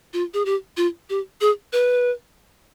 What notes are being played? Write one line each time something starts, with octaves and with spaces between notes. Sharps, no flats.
F4
G#4
G4
F4
G4
G#4
B4